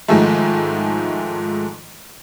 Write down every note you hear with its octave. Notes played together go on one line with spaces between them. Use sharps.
G#2 D#3 F3 G#3 A3